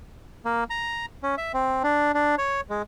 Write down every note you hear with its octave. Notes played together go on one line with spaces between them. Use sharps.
A#3
A#5
C#4
E5
C4
D4
D4
C#5
G#3